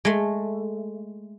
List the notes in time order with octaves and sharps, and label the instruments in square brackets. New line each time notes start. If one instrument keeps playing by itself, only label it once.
[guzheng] G#3 A3